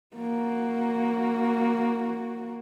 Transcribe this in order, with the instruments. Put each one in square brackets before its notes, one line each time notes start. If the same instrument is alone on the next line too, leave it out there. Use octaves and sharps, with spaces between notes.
[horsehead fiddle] A#3 F#4